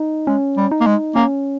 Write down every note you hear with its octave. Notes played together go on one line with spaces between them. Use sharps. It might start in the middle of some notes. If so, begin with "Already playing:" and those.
Already playing: D#4
G#3 C#4
G3
D#4
A#3
G#3
A#3 C#4